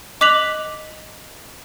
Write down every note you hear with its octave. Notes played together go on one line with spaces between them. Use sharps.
D#5 D6 F#6 B6 F7 F#7